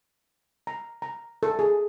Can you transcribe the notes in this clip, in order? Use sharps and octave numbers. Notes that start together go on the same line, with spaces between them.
A#5
A#5
A4
G#4